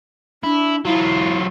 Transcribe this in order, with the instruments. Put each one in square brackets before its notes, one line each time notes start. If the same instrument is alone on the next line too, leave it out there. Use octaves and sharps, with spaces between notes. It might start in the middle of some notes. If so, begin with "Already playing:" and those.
[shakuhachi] D4 [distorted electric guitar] E4
[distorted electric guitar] F#3 F4 [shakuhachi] E4